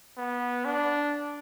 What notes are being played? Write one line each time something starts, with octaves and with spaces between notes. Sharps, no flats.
B3
D4